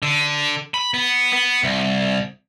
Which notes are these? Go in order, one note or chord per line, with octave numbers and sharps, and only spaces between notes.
D3
B5
B3
B3
C2